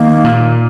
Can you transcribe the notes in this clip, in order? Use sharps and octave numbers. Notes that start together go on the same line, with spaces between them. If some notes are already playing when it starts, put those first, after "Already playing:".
Already playing: D#3 A#3
A#2